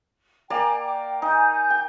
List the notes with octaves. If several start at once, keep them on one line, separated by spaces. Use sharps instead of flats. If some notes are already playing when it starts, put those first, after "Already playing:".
A#3 D5 G5 G#5 A#5
G5
D#4 G#5 G6
G5